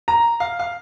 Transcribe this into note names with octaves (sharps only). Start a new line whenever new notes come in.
A#5
F5
F5